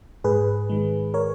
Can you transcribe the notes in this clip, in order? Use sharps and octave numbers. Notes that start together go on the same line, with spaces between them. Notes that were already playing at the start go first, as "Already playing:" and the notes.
G#2 G#4 B4
D#3 G#3
A#4 C#5